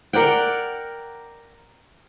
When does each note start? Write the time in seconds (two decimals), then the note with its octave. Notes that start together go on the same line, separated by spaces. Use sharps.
0.13 A#4 D5 F#5 G5